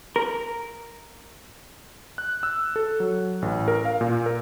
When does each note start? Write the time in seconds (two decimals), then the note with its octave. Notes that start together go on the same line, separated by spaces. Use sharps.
0.16 A#4
2.18 F#6
2.43 E6
2.76 A4
3.00 F#3
3.42 A1
3.68 A#4
3.85 F5
4.01 A#2
4.26 A#4